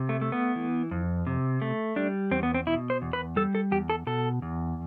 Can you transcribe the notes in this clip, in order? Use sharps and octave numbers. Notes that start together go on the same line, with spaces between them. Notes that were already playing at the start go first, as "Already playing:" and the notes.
Already playing: C3
A3
A3
B3
E3
F2
C3
A3
G3 D4
E2 C4
B3
C4
B2 E4
C5
E2
B4
G3 A4
A4
E2 G4
A4
B2 A4
E2